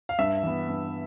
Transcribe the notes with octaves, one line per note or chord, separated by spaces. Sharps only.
F5
G2 E5
E3 B3
G2